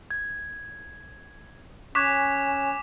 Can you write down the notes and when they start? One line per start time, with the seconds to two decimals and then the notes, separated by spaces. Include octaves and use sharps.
0.11 G#6
1.95 C#4 C#6 D6 F#6 G#6 B6 E7